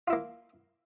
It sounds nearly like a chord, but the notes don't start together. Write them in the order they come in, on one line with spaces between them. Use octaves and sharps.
F4 E4 A#3